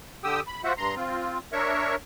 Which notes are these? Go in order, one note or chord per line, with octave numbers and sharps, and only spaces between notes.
D3 G4 G5 D#6 E6
B5
F4 F#4 C5 E5 F#5
G2 A#5 C6
C4 F4
D4 A#4 C#5 E5 C#6